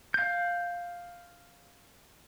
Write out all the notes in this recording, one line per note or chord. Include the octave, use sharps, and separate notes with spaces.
F5 G6